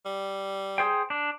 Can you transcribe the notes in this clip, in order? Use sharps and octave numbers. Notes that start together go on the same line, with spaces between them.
G3
G#4 C5 G5
D4